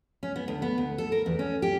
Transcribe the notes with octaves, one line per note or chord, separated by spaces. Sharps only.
C#4
B3
D2
B3
D2
A4
A#4
E2
C#4
G4